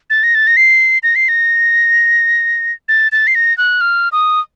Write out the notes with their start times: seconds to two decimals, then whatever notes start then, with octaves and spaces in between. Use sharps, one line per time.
0.10 A6
0.23 A#6
0.35 A6
0.47 A#6
0.57 C7
1.03 A#6
1.16 C7
1.28 A#6
2.89 A6
3.12 A6
3.27 C7
3.35 A#6
3.58 F#6
3.81 F6
4.12 D#6